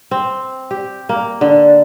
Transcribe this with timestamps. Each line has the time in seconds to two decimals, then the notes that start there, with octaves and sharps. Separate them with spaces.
0.11 C4
0.71 G4
1.09 A#3
1.41 D3